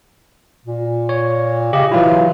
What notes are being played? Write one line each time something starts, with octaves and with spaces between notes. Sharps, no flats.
A#2
C#5
C#3 G4 D#5
E3 F#3 E4 F4